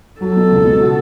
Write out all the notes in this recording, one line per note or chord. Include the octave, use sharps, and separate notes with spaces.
F#3 A4
B2
C#2
B2
F#4